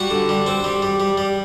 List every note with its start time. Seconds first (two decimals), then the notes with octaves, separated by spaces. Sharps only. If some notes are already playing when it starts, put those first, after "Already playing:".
Already playing: G3 F#4 F#5
0.10 D3
0.29 G3
0.46 C4
0.64 G3
0.82 G3
1.00 G3
1.18 G3